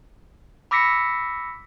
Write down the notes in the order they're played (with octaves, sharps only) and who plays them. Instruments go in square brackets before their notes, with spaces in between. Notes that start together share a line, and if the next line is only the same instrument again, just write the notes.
[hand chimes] B5 D6 E6 A#6 B6 C#7